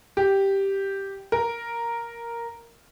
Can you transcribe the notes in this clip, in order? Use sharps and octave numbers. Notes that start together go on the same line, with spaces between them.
G4
A#4